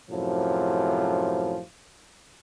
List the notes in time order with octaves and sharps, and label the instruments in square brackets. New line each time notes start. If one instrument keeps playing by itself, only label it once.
[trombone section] F#2 A2 C3 F3